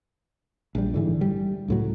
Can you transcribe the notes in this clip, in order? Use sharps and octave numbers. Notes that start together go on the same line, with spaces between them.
A#1 G3
G#2 D3 E3
G3
C#2 A2 F#3